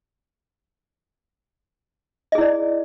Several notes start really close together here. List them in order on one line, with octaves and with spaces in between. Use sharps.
D#5 G#4 E4 D5